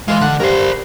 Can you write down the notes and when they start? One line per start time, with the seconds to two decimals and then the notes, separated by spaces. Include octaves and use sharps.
0.08 E3 G#3 F4
0.21 D3 F#5
0.40 G2 A#4 C5